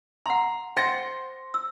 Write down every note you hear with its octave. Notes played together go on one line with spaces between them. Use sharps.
F#5 A#5 C6
C5 F#5 G5 C6 A#6 C#7
E6